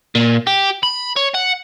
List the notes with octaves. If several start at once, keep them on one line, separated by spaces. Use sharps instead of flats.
A#2
G4
B5
C#5
F#5